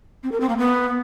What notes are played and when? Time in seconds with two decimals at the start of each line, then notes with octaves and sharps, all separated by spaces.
0.23 C4
0.32 A#4
0.41 C4
0.49 A#3
0.58 B3